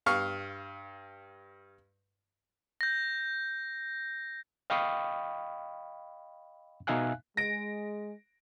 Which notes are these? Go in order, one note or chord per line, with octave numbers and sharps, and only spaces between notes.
G2 F5 C#6 F6
G6 A#6
D#5 F5 G5 B5 C#6 D#6
B2 D#4 E5 F5 G#5 F#6
G#3 A#6 D7